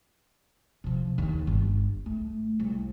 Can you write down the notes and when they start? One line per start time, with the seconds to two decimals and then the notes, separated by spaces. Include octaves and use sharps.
0.84 C3 F3
1.18 D#2 D3
1.47 G1
2.06 A3
2.60 C2